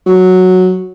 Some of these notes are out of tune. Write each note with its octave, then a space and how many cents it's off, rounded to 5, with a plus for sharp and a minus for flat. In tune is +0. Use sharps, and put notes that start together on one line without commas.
F#3 -5